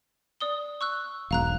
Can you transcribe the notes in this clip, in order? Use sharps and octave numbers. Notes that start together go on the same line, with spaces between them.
D5 D#6 G7
C#6 E6 F#6
E1 B1 F5 A#5 F#6